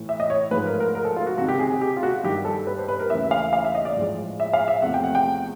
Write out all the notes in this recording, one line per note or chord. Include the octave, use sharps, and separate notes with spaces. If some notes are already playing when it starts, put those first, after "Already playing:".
Already playing: A2 E3 A3
E5
D#5
C#5
G#2 F3 A3 B4
A#4
A#4
A#4
A4
F4
F#4
C#2 C3 D#3 F#4
G4
G#4
G#4
G4
F4
F#4
G2 D#3 G3 G4
A4
B4
C5
B4
A#4
D#2 C#3 E3 A3 E5
F5
F5
E5
D#5
D5
A2 F3 G#3
E5
F5
E5
E2 C3 F3 A3 F#5
G5
F#5
G5